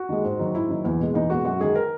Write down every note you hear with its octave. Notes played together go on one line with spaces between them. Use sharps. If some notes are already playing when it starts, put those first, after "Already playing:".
Already playing: F#4
D#3 G#3
G#2
D#3 F#3
G#2 E4
D#3 F#3
E2
B2 G#3
E2 D#4
B2 G#3 F#4
F#2 F#4
D#3 G#3 G#4
A#4